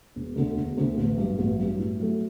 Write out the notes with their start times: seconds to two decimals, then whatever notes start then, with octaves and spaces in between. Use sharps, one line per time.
0.16 E1
0.36 D2 D3
0.57 E1
0.77 D2 D3
0.97 A1
1.18 G2 F#3
1.39 A1
1.59 G2 F#3
1.79 A2
2.00 F#3 A3